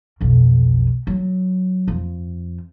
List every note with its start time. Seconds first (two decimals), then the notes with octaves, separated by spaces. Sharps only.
0.21 B1 F2
1.07 F#3
1.88 F2